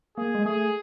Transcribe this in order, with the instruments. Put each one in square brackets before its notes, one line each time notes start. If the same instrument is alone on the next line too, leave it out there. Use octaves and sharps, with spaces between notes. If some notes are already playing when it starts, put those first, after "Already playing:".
[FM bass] A#3 [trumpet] G#4
[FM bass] G#3
[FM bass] A3 [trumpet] G#4